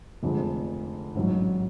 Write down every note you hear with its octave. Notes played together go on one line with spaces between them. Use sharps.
F1 F2 D3 G#3
A1 G#2 F#3